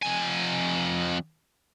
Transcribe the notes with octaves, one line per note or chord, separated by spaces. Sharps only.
F2 G#5